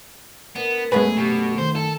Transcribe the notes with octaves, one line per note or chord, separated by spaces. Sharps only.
B3 D4 A#4
F#2 G#3 A3 B3 C#4 G#4 B4
B2 G4
D#3 C5
A4